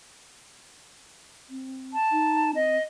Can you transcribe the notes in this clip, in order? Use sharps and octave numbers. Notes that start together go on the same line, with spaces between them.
C4
A5
D#4
C4 D#5